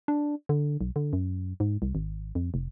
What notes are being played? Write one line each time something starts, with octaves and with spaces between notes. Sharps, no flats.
D4
D3
B1
D3
F#2
G#2
C2
G#1
F2
F1